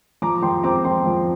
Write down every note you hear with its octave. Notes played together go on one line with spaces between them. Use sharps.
F3 A#5 D6
F3 G5 C6
C4 A#5 D6
C4 G5 C6
F3